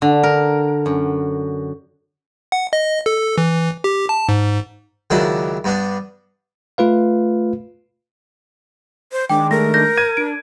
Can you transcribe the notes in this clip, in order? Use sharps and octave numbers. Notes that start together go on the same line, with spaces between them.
D3
A#4
F#2
F#5
D#5
A4
E3
G4
A5
G#2
C#2 D#3 F#3 D4 E4
G2 B3 D4
A3 F4 B4 F5
C5
D#3 G#3 D4 G5 D6
A3 A#4 A#6
G6 A#6
G#6 D#7
D4 D7